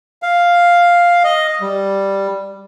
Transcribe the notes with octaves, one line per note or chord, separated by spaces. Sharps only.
F5
D#5
G3